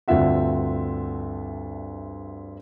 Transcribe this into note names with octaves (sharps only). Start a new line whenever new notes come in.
D2 G2 C4 F4 E5 F#5